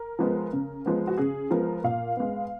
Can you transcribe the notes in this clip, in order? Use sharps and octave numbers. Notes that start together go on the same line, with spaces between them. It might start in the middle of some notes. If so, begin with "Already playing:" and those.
Already playing: A#4
F3 G#3 B3
C#3
F3 G#3 B3
F#4
C#3 G#4
F3 G#3 B3 A#4
A#2 F5
G#3 B3